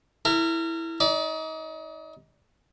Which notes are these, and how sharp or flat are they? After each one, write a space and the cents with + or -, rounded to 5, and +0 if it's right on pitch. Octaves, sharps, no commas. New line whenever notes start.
E4 +0 A#4 -30
D#4 +30 D5 -15